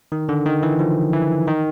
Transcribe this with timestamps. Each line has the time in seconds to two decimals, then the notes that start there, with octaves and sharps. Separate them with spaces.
0.12 D#3
0.29 D3
0.46 D#3
0.63 E3
0.79 F3
1.13 E3
1.47 D#3